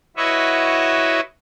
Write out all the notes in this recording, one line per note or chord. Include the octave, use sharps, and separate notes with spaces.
E4 F#4 B4 C#5 D#5 E5